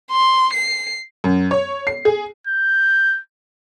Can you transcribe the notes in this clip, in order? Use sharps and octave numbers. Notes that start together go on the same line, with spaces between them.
C6
C7
F#2
C#5
C7
G#4
G6